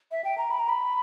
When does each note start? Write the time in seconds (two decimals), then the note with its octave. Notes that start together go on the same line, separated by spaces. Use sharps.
0.11 E5
0.24 G5
0.38 A#5
0.51 B5
0.59 A#5
0.69 B5